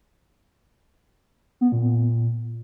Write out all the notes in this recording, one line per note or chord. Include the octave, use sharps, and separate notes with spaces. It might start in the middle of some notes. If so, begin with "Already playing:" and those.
B3
A#2
A#2